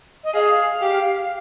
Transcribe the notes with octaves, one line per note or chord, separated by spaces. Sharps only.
D#5
G#4 F5
G4